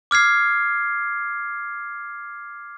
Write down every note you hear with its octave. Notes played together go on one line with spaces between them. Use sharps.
D6 F6 G#6 C7